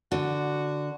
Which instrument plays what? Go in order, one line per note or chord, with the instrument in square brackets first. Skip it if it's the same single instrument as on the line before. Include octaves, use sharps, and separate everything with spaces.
[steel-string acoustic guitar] D3 [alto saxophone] F#4